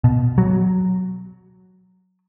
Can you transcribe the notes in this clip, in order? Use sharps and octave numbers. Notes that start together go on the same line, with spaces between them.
B2
F#3